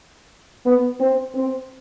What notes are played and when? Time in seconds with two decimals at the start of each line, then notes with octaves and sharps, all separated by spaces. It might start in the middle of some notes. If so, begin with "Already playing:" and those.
0.66 B3
1.00 C4
1.35 C4